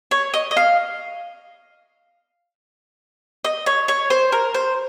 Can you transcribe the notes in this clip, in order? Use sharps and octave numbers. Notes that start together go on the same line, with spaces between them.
C#5
D#5
D#5
F5
D#5
C#5
C#5
C5
A#4
C5